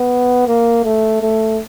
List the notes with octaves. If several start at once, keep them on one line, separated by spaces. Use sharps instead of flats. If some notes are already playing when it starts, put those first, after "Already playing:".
Already playing: B3
A#3
A3
A3